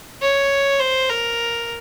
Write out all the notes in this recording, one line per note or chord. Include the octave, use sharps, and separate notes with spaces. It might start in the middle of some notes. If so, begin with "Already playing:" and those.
C#5
C5
A#4